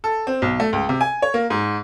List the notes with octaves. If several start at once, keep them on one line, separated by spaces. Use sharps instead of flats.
A4
C4
B1
A3
C#2
C3
G#5
C#5
A#3
G#2